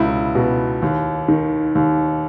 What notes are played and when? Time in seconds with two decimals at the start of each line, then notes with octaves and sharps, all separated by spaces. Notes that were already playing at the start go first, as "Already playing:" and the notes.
Already playing: C#2 B2 E4
0.35 B2
0.82 D#2
1.28 D#3
1.75 D#2